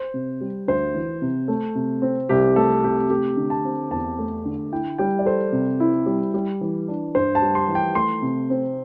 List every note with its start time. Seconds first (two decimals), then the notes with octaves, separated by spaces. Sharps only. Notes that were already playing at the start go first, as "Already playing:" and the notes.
Already playing: C5
0.14 C3
0.41 G3
0.68 D2 C5
0.94 E3
1.22 C3
1.48 A3
1.75 C3
2.02 C4
2.29 C2 G4
2.56 A3 A4
2.83 C3 G4
3.10 A3 G4
3.37 D3
3.50 A5
3.65 C4
3.91 E2 A5
4.19 A3
4.45 D3
4.72 E4 G5
4.98 G3 G5
5.19 D5
5.26 A4 C5
5.52 C3
5.80 E4
6.06 G3
6.34 G3
6.61 E3
6.88 D4
7.15 G2 C5
7.35 A5
7.42 G3
7.55 C6
7.68 E3
7.75 G5
7.95 A3 C6
8.22 C3
8.50 C4